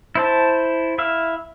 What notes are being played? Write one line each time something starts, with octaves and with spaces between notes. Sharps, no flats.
E4 C5 A5
E4 E5 F5